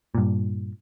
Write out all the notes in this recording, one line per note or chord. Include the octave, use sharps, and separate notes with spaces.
G2 A#2